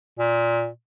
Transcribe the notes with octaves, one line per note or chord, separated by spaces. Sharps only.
A#2